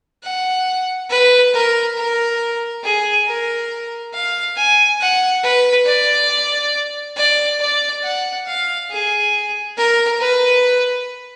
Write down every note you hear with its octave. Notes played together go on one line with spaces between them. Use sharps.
F#5
B4
A#4
A#4
G#4
A#4
F5
G#5
F#5
B4
D5
D5
D5
F#5
F5
G#4
A#4
B4